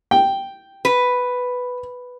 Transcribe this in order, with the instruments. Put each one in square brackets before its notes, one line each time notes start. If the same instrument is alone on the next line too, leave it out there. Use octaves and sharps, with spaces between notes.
[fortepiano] G5
[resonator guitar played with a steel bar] B4